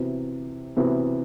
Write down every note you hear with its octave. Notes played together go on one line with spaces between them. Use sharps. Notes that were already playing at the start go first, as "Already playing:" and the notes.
Already playing: C3 E3 B3 F#4
C3 E3 B3 F#4